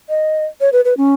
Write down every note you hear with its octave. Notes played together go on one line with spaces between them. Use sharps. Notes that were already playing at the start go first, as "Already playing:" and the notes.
D#5
C#5
B4
B4
C#4